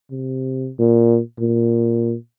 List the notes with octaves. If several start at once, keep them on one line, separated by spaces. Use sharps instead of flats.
C3
A#2
A#2